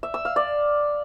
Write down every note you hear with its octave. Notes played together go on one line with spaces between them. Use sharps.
E5
E6
F5
D5